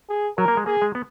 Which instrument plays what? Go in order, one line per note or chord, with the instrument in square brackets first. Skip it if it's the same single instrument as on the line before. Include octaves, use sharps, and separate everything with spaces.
[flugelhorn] G#4
[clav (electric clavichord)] F#3 [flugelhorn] A#4
[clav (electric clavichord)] A#3
G#3
[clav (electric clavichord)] A#3 [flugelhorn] G#4
[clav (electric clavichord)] G#3
B3